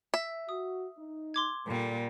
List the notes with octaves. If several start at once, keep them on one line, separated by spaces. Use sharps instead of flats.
E5
F#4 D#6
D#4
C6 D6 G#6
A#2 D3 G3 A#3 A4